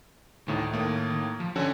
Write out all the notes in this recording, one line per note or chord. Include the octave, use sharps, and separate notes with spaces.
D2 A2 D#3
A2 A#3
F3
D3 C#4 F#4 A4 E5 G#5